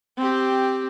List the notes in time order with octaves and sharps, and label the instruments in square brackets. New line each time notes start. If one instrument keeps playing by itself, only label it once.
[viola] C4 G4